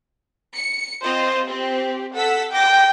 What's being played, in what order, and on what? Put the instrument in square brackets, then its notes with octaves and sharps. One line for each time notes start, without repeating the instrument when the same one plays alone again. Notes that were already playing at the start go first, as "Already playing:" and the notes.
[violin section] C#7
[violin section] C4 F4 D#5 [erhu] C5
[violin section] C4 [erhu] G4
[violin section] A4 E6 B6 [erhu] F#5
[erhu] G5 [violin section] D6 A#6